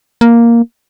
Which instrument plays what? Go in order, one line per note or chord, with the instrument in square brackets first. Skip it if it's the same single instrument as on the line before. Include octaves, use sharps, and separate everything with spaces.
[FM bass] A#3